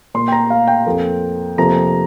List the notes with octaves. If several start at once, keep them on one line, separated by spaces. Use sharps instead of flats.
A#2 A#3 C6
G5
A#5
F5
G5
F2 F3 A#3
F2 C3 F3 A#3 A#5